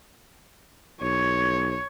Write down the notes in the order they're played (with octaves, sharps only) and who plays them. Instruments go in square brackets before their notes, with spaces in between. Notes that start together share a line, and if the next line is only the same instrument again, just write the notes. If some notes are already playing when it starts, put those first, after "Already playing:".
[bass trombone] B1 [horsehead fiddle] C#5